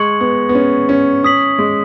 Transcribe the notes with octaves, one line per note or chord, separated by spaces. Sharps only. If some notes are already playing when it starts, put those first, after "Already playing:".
Already playing: G#3 C#6 G#6 C#7 F#7
B3
B3
C#4
C#4
C#4 D#6 B6 F#7
G#3